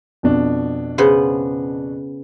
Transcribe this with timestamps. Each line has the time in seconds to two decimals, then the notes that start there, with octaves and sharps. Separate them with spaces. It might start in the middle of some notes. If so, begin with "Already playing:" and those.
0.23 F2 B2 D4
0.98 C#3 B3 C5